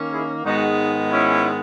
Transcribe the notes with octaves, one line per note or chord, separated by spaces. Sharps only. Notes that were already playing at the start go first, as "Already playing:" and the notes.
Already playing: D#3 A#3 C#4
E4 G#4
G#2 D#3 G#3 B3 D#4 F#4
C#4 E4